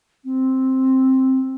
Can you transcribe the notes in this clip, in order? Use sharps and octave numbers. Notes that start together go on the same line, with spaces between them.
C4